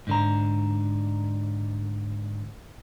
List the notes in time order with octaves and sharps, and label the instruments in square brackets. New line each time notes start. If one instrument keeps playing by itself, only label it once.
[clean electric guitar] G#2 D3 A#5